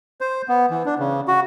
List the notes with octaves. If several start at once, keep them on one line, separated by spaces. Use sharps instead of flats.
C5
B3
E3
D4
C#3
F#4